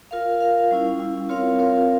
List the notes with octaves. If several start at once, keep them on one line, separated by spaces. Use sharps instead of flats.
F4 A#4 F5
F4 A#4 F5
G3 C#4 E4
G3 C#4 E4
C4 F4 A#4 C#5 F5
C4 F4 A#4 C#5 F5